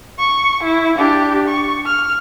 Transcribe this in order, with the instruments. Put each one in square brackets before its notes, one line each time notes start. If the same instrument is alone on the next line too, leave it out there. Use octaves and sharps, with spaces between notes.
[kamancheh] C#6
E4
D4 G4
C#6
F6